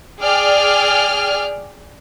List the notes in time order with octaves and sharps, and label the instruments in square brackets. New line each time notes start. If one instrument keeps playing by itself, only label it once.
[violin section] G#4 D5 G5 F6